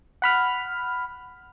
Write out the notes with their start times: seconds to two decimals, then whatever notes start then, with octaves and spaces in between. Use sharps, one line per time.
0.22 F#5 B5 F6